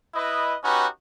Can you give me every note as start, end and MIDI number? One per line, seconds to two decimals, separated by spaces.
0.15 0.56 64
0.15 0.56 71
0.15 0.56 75
0.64 0.87 61
0.64 0.87 63
0.64 0.87 66
0.64 0.87 67
0.64 0.87 71